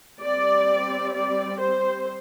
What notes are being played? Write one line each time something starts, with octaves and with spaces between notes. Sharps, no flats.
G3 C4 D5
D5
C5